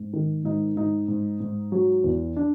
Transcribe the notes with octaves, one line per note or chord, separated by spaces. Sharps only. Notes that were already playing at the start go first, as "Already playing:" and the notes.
Already playing: G#2
D#3
G#2 D#4
G#2 D#4
G#2
G#2
F#3
E2
D4